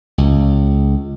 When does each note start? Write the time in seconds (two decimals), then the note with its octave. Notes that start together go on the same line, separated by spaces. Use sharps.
0.18 C#2